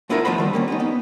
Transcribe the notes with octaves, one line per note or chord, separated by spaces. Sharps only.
A3 B3 D4 E4 F4 A#4
F3 A3 B3 C5 B5
D#3 G3 B3
G3 A#3 C#4
B3 C#4 D#4
B3